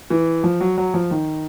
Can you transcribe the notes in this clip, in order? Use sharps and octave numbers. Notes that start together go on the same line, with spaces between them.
E3
F3
F#3
F#3
F3
D#3